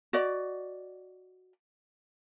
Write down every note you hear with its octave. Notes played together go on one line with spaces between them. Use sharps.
F#4 D5 D#5